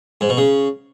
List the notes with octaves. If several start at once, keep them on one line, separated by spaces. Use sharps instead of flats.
G#2
B2
C#3